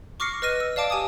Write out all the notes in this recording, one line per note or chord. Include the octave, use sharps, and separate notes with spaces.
C#6 D6 F6 A#6 C7 C#7
B4 D#5 F6 A#6 D#7
E6
D5 F5 A5 D6 D7
G4 G#5 D6 D#6